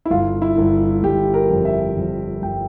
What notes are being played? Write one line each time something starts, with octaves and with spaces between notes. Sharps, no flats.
E4
G1 F4
E4
G1
G1 G4
A#4
F2
E5
F2
G1 G5